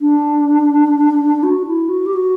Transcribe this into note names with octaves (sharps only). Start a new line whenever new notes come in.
D4
F#4
E4
F#4
G4
F#4